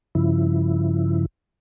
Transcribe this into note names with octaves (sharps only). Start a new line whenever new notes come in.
G2 C#3 F3 E4